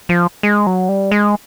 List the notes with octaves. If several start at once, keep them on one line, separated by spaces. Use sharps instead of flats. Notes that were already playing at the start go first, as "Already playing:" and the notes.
F3
G#3
F#3
G3
G#3